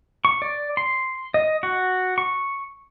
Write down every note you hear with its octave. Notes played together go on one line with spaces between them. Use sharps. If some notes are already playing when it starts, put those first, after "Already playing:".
C#6
D5
C6
D#5
F#4
C#6